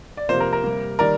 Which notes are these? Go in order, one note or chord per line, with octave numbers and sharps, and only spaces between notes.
D5
C3 F3 A#3 C5
A#4
A#4
C3 G3 A#3
D#3 G3 A#3 A#4 D5